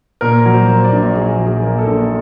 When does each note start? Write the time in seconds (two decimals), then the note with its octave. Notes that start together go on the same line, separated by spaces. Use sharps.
0.21 A#2 A#4
0.46 F#3
0.53 C5
0.69 A#3
0.84 D5
0.92 A#1
1.16 A#2 G#4
1.39 F#3
1.47 G#4
1.63 A#3
1.79 A4
1.87 A#1